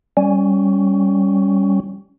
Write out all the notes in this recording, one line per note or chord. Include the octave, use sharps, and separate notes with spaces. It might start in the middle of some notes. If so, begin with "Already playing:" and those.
G3 C#4